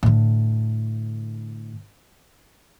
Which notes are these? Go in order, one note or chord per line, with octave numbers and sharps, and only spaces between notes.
A2 D3